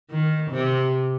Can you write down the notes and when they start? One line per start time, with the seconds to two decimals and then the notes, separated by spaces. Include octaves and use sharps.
0.11 D#3
0.51 C3